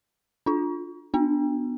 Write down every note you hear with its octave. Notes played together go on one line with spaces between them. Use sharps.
D4 F4
B3 D4